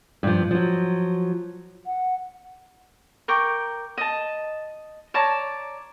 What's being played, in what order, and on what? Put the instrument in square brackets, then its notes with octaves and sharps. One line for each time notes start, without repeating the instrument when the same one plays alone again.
[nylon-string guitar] G2 F3
F3 F#3
[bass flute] F#5
[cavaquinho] A#4 G5 C#6 D6
D#5 A5
C#5 D5 A5 A#5